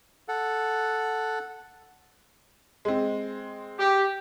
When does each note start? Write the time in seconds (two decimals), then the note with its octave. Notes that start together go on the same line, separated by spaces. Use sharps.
0.28 A4 F#5
2.85 G#3 C4
3.77 G4